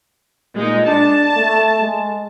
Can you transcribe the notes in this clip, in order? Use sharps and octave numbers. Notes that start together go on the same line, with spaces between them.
A#2 G#3 D#4
D4 A5
A3
G#3